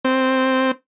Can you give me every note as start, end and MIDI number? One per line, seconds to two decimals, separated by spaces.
0.05 0.71 60